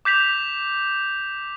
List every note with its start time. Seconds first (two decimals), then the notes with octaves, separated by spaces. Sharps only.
0.05 D6 G6 B6 F7